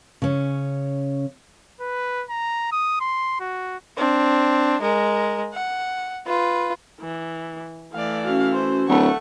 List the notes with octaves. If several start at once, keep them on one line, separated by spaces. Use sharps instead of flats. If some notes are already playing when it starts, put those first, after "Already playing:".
C#3 C#4
B4
A#5
D#6
C6
F#4
C4 D4
G#3 A#4
F#5
F4 B4
E3
E3 A3 D5 F5
C#4 F#4 F5
C5
D1 A3 F#5 C#6